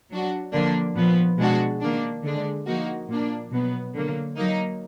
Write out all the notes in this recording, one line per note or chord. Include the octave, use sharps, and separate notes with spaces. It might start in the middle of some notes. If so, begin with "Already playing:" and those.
F#3 D4 F#4
D3 F3 A#3 D4
A#2 F3 B3
B2 G#3 D4 F#4
D#3 A#3 D4
D3 G#3 D4
F3 A#3 D#4 F#4
A#2 F3 A#3 D4
B2 F#3 B3
D3 F#3 A#3
F#3 A#3 D#4